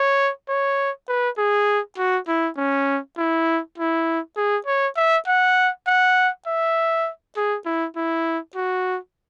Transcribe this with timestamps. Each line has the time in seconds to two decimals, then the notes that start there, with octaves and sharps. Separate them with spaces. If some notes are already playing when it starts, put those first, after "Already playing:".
Already playing: C#5
0.49 C#5
1.08 B4
1.38 G#4
1.97 F#4
2.28 E4
2.57 C#4
3.18 E4
3.78 E4
4.36 G#4
4.67 C#5
4.97 E5
5.27 F#5
5.87 F#5
6.47 E5
7.36 G#4
7.65 E4
7.96 E4
8.55 F#4